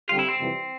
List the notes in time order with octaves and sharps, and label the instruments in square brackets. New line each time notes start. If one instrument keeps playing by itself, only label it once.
[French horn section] D3 G3 C4 G4 [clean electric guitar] F4
[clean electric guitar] E4
C4
[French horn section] F2 C3 E3 G3